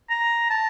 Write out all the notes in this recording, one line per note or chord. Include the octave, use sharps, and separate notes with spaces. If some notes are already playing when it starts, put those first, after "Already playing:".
A#5
A5